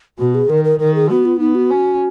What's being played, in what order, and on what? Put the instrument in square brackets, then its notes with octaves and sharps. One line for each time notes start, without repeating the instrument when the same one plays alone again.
[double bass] B2 [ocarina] F#4
[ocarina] G#4
[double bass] D#3 [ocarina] A#4
[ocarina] A#4
[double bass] D#3 [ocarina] A#4
[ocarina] G#4
[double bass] B3 [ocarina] F#4
[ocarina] F4
[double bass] B3 [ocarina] D#4
[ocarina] F#4
[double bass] C#4